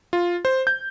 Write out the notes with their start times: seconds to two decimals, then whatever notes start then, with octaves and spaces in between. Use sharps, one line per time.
0.13 F4
0.45 C5
0.67 G6